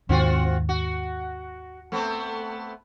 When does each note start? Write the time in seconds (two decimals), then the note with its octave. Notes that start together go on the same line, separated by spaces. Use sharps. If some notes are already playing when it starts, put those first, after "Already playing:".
0.09 D#2 G#2 D#3 C4 F4 F#4
0.69 F#4
1.92 A3 B3 C4